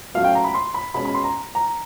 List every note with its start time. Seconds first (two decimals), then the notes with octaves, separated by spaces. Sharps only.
0.14 A2 F#3 A3 C#4 F5
0.24 G5
0.35 A#5
0.44 B5
0.55 C6
0.74 B5
0.94 B2 G#3 C#4 B5
1.05 B5
1.15 C6
1.24 A#5
1.55 A#5